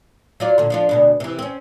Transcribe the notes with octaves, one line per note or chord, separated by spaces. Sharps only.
F#3 F4 D5
A#2 D3
F3 D4 F4
D2 B2 D4
C3 E3
C4 C#4